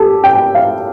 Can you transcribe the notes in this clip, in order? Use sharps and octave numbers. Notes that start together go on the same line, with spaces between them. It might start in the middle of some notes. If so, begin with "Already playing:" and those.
Already playing: G4 A4
G5
F5